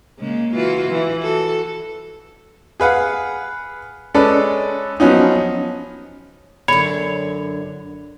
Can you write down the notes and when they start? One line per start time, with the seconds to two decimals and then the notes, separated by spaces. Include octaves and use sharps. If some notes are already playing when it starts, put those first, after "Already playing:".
0.19 C#3 G#3 A#3
0.54 E3 F4 F#4
0.89 E3
1.22 F#4 A4
2.80 G#4 B4 F5 F#5
4.14 G#3 C#4 A4 B4 D5
5.00 F3 F#3 B3 C#4 D#4
6.68 F#2 D3 C#5 B5